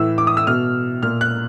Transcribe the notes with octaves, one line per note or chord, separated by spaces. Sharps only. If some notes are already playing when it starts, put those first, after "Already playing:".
Already playing: A2 E3 E6
D6
D#6
E6
B2 F6
A#2 F6
F#6